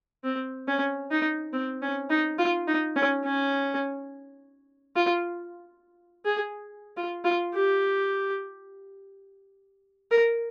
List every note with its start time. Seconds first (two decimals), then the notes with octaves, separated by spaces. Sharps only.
0.24 C4
0.68 C#4
1.11 D#4
1.53 C4
1.82 C#4
2.10 D#4
2.39 F4
2.68 D#4
2.96 C#4
3.25 C#4
4.96 F4
6.25 G#4
6.97 F4
7.25 F4
7.54 G4
10.11 A#4